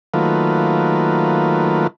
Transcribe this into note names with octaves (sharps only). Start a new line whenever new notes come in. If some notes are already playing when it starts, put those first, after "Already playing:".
D#3 F#3 A3 A#3 F4 B4